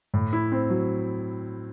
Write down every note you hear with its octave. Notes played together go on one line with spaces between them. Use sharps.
A2
E4
C4
F#3